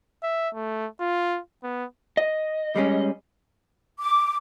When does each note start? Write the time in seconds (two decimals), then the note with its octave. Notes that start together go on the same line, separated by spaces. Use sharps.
0.23 E5
0.54 A3
1.00 F4
1.63 B3
2.17 D#5
2.76 G3 G#3 C#4
3.99 D6